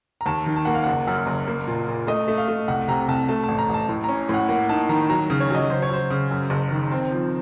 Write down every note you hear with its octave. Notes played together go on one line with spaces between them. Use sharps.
A#5
D#2 A5
D#3
A5
A#3 F#5
F5
F#1 F#5
F#2
F#1
A#3
A#2
A#2
A3 D#5
A3
F5
A3
C2 F#5
C3 A#5
C2 A5
A3 A5
A1 A5
A#5
A1 A5
A2
C#4 A#5
A2 F#5
A#3 F#5
D#4 A5
D#3 A#5
F#3 A#5
C#3
C#5
F#3 D#5
C#3 C5
C#5
F#3 C5
C#3
F#2
F#1
D#3
C4
F3